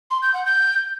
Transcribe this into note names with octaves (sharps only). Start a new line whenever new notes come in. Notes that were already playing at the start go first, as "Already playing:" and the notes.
C6
G6
F#5
G6